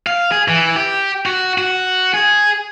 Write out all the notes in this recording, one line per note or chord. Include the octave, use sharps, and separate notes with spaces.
F5
G#4
E3
G4
F#4
F#4
G#4